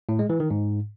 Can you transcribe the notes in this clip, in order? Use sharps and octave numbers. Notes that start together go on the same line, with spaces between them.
A2
G#3
E3
D#3
G#2